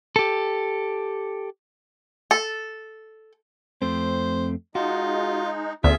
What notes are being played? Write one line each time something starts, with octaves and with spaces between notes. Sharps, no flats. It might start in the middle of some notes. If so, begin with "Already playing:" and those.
G4 A4
A4
F2 A3 C4 C5
G#3 D#4 F4 F#4
D2 B3 C#4 D4 F4 G#4 E5